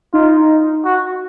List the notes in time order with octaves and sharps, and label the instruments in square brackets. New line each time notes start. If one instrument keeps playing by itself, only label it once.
[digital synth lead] D#4 [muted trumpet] F4
[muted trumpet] F#4